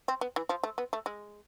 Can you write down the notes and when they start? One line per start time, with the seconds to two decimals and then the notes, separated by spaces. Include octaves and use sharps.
0.08 C4
0.21 B3
0.36 E3
0.49 F3
0.63 A3
0.78 B3
0.93 A3
1.06 G#3